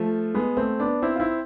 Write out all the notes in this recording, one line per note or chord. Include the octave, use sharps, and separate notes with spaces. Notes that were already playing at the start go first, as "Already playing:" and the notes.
Already playing: F3 A3
G#3 B3
A3 C4
B3 D4
C4 E4
F4
C4 E4